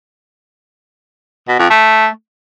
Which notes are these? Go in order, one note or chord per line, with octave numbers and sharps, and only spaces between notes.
B2
F2
A3